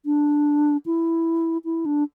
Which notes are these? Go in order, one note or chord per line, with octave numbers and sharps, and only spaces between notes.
D4
E4
E4
D4